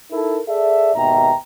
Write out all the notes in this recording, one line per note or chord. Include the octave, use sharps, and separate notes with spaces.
D#4 E4 A4 A#4
G#4 A4 D5 E5
G#1 D#2 B2 E5 G5 A#5